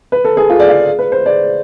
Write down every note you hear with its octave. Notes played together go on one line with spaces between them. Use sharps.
B4
A4
G#4
F4
D5
F5
B4
C5
D5